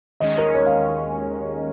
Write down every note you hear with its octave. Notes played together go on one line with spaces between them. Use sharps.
D#2 D#3 G#3 C#4 D#5
A#4
C#5
F5